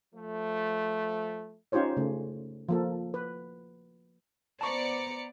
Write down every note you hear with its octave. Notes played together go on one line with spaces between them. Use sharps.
F3 A3
C#4 D#4 F4 G4 C5 C#5
C#3 A3
F3 A#3 A4
B4
B3 C5 D5 A5 A#5 C#6 D6 C#7